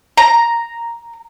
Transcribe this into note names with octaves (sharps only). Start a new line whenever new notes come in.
A#5